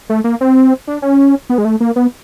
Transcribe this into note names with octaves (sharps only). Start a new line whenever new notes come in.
A3
A#3
C4
D4
C#4
B3
G#3
A3
A#3
B3